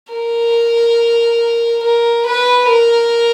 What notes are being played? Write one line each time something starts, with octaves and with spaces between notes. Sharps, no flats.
A#4
A#4
B4
A#4